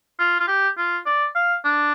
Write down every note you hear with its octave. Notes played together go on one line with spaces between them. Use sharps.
F4
F4
G4
F4
D5
F5
D4